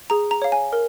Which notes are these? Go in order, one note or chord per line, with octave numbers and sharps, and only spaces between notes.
G#4 A#5
A#5
C#5 F5
G#5
A#4